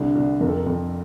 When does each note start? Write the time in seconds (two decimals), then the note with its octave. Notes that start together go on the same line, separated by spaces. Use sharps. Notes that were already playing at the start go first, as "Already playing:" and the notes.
Already playing: C2 D3
0.15 C2
0.40 F2 A#4
0.49 A4
0.57 A#4
0.66 F2